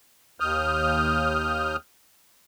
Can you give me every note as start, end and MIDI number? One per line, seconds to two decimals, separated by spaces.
0.40 1.76 39
0.40 1.76 87
0.40 1.76 89
0.40 1.76 91